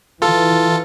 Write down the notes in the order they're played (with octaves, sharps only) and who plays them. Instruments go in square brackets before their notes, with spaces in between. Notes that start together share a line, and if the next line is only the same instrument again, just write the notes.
[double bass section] E3 [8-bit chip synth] F4 A4